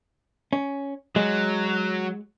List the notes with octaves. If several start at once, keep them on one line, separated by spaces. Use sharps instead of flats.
C#4
F#3 G#3